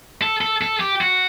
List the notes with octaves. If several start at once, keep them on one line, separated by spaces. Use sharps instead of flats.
A4
A4
A4
G4
F#4